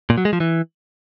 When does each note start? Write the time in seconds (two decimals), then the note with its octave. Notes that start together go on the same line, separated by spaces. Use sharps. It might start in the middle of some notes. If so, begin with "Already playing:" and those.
0.10 A#2
0.18 F#3
0.25 G#3
0.33 F3
0.40 E3